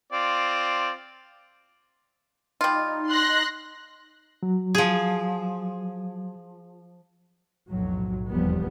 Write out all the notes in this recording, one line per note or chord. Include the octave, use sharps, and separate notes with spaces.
C4 F4 D5
G3 D#4 F4
C6 F#6 A#6
F#3
F3 G#4
B1 F2 A2 F#3
F1 E2 F3 G3 B3